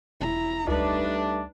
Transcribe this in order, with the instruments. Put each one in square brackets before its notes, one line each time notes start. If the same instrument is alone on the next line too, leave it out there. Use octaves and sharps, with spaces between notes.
[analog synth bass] E1 [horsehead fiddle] E4 A#5
[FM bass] C#2 [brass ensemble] G3 A3 D4 [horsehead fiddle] D#4 B4